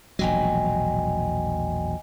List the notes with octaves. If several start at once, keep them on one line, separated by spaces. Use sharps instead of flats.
E1 A#1 F#3 D#5 G5 G#5